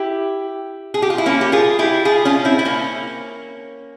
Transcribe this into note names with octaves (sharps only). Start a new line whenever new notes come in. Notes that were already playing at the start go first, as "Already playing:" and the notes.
Already playing: E4 G4
G#4
G4
F4
E4
A#3 C#4
G4
F4 G#4
E4 G4
F4 G#4
C#4 F4
C4 E4
E4
A#3 C#4